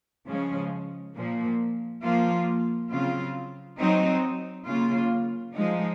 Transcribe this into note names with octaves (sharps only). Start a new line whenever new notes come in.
C#3 F3 G#3 C#4
A#2 F3 A#3
F3 A#3 F4
C#3 F#3 C4 F4
F#3 C4 D#4
C#3 F#3 A#3 F4
F3 G#3 D#4